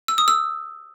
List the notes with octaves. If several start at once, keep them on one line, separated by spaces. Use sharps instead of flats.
E6
D#6
E6